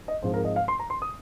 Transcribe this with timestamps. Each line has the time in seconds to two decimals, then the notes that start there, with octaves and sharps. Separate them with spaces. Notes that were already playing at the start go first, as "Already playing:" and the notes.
0.08 D#5
0.22 G#2 F3 G#3 C4 C5
0.34 A#4
0.45 D#5
0.56 F5
0.68 C6
0.79 A#5
0.90 C6
1.02 D#6